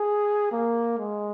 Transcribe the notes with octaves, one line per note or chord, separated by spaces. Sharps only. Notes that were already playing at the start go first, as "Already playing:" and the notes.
Already playing: G#4
A#3
G#3